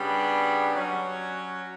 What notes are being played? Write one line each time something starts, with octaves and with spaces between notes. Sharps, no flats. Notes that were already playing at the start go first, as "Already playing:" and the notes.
Already playing: C#3 G3 B3 D4
F#3 C#4 F#4